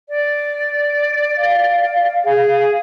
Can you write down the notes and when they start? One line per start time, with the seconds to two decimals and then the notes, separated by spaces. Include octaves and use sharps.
0.09 D5
1.38 F5
2.25 G#4